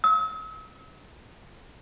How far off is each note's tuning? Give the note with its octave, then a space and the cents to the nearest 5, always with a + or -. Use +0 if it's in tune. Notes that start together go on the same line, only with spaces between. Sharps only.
E6 -45